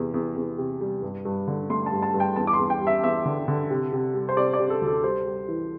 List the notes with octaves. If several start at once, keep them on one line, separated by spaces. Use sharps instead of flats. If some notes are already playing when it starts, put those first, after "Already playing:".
Already playing: E2 C3
E2
E2
C3
G3
G2
G2
D3
A3 C6
A5
G2
A5
G2
G5
E2 A5
D6
C6
E2
G5
G3
E5
E2 E5
D3
D3
C3
C3
G3
C5
C3 D5
D5
C3
A4
D2
A4
G3 C5
G3
E3